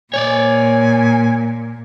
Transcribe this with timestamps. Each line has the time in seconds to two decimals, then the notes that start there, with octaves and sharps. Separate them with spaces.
0.14 A#2 C#5 D5 G#5